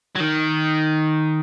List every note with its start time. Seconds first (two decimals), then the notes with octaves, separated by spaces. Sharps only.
0.15 F#3
0.20 D#3